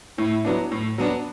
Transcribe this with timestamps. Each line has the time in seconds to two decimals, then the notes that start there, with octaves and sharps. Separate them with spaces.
0.18 A2 E4
0.45 F#3 B3 D4
0.71 A2
0.98 F#3 B3 D4